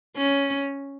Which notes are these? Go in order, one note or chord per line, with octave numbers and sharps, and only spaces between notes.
C#4